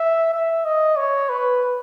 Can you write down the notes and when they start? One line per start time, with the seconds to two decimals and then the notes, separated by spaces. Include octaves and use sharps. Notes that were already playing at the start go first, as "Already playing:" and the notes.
Already playing: E5
0.34 E5
0.65 D#5
0.97 C#5
1.29 B4